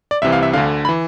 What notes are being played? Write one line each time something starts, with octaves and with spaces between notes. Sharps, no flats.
D5
C2 C3 E3 E5
F5
E5
D2 D3 F5
B5
E3